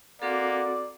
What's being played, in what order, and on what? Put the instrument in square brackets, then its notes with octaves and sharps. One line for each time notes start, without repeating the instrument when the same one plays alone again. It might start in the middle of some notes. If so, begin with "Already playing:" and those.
[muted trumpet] A#3 [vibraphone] C4 F#4 A4 [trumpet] D5 [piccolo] F#5